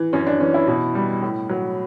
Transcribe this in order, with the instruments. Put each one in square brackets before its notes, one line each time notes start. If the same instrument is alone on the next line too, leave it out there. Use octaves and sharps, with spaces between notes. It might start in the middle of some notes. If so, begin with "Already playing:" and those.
Already playing: [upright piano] E3
F#2 C#4
D4
E3 C#4
E4
B2
G3
A2
F#3